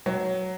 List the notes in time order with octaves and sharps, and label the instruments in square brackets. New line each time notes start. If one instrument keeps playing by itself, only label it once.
[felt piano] F#3